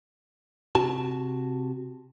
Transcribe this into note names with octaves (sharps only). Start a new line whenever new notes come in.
C3 F#4 A5